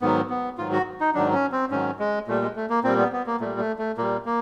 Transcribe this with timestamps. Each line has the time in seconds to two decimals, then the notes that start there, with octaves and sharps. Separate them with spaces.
0.01 G#2 D#3 F#3 B3
0.30 B3
0.58 G#2 D#3 F#3 F4
0.72 F#4
1.00 D#4
1.14 G#2 D#3 F#3 D4
1.33 C#4
1.52 C4
1.71 G#2 D#3 F#3 C#4
1.99 G#3
2.27 A#2 G3 A3
2.42 G#3
2.56 A3
2.70 A#3
2.84 A#2 G3 C4
2.98 B3
3.13 B3
3.26 A#3
3.41 A#2 G3 A3
3.59 A3
3.79 A3
3.98 A#2 G3 A#3
4.25 A#3